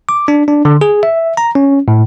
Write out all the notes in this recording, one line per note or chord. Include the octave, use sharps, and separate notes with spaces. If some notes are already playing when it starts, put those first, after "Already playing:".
D6
D4
D4
D3
G#4
E5
A#5
C#4
A2